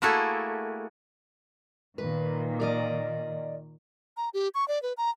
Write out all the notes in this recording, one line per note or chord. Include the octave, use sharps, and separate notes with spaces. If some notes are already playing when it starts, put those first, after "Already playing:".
A3 A#3 E4 F#4 G#4 A4
A#2 D#3 B4
A#4 D5 D#5
A#5
G4
C#6
D5
B4
A#5